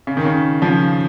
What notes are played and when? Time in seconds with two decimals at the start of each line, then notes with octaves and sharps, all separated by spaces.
0.07 C#3
0.17 D#3
0.26 C#3
0.62 C#3 F3